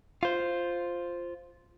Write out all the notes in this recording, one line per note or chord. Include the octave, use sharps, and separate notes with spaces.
F4 C5